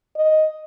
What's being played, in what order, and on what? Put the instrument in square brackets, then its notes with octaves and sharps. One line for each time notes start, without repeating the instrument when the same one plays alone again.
[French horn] D#5